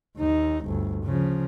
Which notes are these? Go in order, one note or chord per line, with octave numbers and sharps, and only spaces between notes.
D#2 D#4
G1 D2
C#3 F3